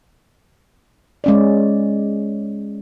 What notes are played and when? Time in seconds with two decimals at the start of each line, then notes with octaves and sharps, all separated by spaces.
1.24 G#3 C#4 D5